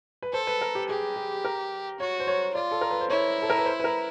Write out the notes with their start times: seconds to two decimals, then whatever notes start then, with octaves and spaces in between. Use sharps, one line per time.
0.22 B4
0.33 A4 C5
0.47 B4
0.61 A#4
0.75 G4
0.89 G4 G#4
1.16 G#4
1.45 A#4
2.00 F#4 C#5
2.20 C5
2.27 C#5
2.55 F4 D5
2.71 A4
2.81 A#4
2.91 B4
3.01 C5
3.10 E4 C#5
3.42 A4
3.50 A#4
3.58 B4
3.66 C5
3.80 B4
3.84 A#4